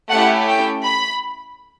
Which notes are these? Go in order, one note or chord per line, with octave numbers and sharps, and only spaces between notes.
A3 C#4 E4 G4 F#5
G5
B5